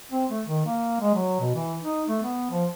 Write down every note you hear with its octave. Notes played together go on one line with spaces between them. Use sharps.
C4
A3
D#3
A#3
G#3
F#3
B2
E3
D#4
A3
B3
F3